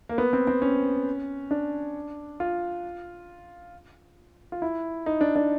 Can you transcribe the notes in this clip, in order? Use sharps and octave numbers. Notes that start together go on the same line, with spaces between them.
A#3
B3
C4
C4
C#4
D4
F4
F4
E4
D#4
D4
D4